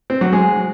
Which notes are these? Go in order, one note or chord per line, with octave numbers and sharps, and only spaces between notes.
C4
F#3
G#3